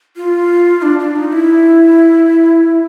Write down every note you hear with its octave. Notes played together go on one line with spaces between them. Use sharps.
F4
D4
D4
D#4
E4